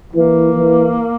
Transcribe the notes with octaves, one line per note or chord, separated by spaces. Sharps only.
E3 A#3
E3